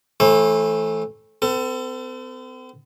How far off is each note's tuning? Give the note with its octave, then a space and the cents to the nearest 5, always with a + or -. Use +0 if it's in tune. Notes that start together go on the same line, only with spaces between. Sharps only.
E3 -10 A3 -10 C5 +40
C4 -45 A4 +25